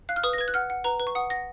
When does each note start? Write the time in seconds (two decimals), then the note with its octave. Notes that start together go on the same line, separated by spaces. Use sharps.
0.09 F5 F#6
0.16 F6
0.24 B4 D#6
0.33 A#6
0.38 B4 G#6
0.48 F#6
0.54 F#5 F6
0.70 F#5
0.84 B4 A#5
1.00 B4
1.07 C#6
1.15 F#5 D#6
1.30 F#5 A#6